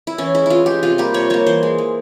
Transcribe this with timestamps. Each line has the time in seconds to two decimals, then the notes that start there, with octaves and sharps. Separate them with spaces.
0.07 E4
0.18 E3 C#4
0.34 G#3 E4
0.46 E3 E4 F4
0.66 G#3 G4
0.83 C3 F4
0.98 G3 A#3 G4
1.14 C3 C#5
1.30 G3 A#3 C#5
1.47 E3 C5
1.63 G#3
1.78 E3